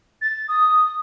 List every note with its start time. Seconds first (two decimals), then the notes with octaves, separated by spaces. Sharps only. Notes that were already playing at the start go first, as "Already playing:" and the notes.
0.22 A6
0.48 D#6